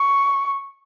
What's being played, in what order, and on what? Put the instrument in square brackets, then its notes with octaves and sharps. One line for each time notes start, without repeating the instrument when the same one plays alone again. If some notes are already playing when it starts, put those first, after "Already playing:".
Already playing: [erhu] C#6